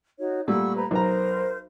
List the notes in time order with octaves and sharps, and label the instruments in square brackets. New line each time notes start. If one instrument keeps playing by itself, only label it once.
[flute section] D#4 F#4 C#5
[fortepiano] A#2 G3 A3 [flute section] F#5 C#6 E6
[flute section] B4 C5 A#5
[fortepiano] B1 A#5 [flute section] A#4 C5